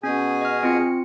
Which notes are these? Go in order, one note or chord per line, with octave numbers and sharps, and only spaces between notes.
B2 C#4 G#4 G#5
D#5 F6
C4 F4 C#7